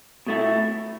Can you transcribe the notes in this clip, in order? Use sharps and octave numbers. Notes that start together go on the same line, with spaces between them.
B2 A3 E4